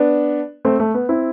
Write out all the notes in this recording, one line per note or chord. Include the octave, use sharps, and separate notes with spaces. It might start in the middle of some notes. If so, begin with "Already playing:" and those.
Already playing: B3 D4
A3 C4
A3
B3
C4 E4